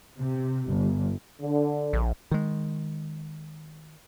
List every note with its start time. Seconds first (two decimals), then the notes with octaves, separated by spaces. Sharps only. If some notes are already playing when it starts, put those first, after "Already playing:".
0.19 C3
0.73 G1
1.42 D3
1.93 A#1
2.31 D#3 G#3